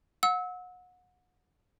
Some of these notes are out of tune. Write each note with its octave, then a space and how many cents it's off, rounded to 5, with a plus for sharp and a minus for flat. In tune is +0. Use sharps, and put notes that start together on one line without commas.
F#5 -30 E6 -30